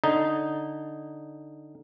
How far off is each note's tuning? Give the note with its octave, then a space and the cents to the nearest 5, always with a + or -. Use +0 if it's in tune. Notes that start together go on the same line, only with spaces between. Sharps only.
D3 +0 D#4 +0